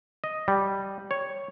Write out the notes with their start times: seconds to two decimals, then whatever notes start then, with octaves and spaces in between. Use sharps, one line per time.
0.24 D#5
0.48 G3
1.11 C#5